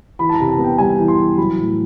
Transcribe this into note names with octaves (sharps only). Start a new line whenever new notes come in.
E3 B5
A5
A#5
C3
A5
B3
G5
G3 G#5
E3
C6
E3
F#3 B5
A2